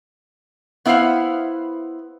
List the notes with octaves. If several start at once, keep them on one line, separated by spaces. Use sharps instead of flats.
B3 E4 B4 C5 F5 F#5